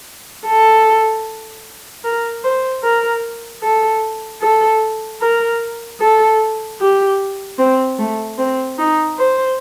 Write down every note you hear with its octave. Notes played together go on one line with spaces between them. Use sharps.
A4
A#4
C5
A#4
A4
A4
A#4
A4
G4
C4
A3
C4
D#4
C5